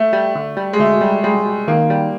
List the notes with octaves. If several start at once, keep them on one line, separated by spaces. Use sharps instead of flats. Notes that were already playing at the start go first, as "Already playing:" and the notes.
Already playing: A3
G3
D3
G3
G#3
D3 A3
G3
G3 G#3
G3
D#3 A#3
G3